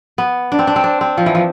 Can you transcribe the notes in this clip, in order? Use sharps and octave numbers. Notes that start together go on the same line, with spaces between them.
B3
D4
C4
D4
C4
D4
C4
F3
E3
F3